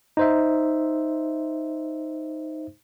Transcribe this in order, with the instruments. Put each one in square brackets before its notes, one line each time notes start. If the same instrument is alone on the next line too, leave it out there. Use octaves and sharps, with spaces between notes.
[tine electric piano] D#4 C5 E5